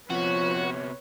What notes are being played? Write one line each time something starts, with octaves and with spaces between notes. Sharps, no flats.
C3 F3 B3 F#4 B4 C#5